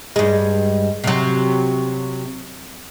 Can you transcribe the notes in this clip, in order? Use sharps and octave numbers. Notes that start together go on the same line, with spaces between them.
G2 G#3
C3 F#3